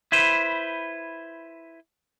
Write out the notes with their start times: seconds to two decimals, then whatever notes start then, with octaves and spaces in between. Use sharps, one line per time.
0.12 E4 B4 C5